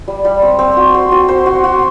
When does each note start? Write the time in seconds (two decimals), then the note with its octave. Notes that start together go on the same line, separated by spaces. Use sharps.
0.08 G3
0.25 G3
0.42 C4
0.59 C4
0.77 F#4
0.94 C5
1.12 F#4
1.28 C5
1.46 F#4
1.64 F#4